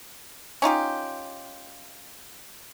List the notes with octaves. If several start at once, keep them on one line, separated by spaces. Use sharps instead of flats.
C#4 D#4 F4 G4